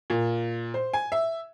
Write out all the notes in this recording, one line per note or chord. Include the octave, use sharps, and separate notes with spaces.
A#2
C5
G#5
E5